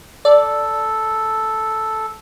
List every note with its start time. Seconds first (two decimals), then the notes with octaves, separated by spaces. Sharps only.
0.25 A4 D5